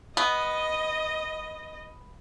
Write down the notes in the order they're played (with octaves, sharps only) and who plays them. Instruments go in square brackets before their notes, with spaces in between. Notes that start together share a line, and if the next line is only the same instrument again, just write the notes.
[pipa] B3 [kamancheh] D#5